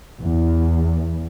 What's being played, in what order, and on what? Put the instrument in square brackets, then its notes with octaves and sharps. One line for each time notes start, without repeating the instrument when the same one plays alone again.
[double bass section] E2